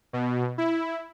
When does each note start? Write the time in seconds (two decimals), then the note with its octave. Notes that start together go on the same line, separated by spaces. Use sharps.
0.13 B2
0.58 E4